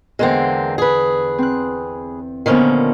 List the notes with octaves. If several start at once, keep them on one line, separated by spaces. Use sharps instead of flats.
E2 D3 G#3 A#3 C4 F#5
G#4 B4
C4 F#6
A#2 D3 D#3 F3 B3 C#4